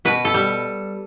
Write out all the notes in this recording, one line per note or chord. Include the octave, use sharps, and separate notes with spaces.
B2 B4
A4
G3